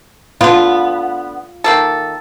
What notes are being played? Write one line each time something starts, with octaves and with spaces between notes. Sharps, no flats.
D3 B3 F4
D#3 A#3 A4